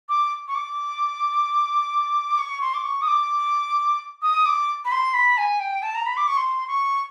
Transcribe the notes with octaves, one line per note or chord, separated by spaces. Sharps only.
D6
C#6
D6
C#6
C6
D6
C#6
D#6
D6
D#6
D6
B5
C6
B5
G#5
G5
A5
A#5
B5
D6
C#6
C6
C#6